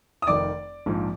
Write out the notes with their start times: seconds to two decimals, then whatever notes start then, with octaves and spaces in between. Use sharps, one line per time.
0.22 D#6
0.27 F1 F2 D#3 D5 D6
0.86 A#1 G#2 F3